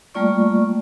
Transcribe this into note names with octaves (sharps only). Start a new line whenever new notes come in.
G3 A3 A#3 F4 D5 C#6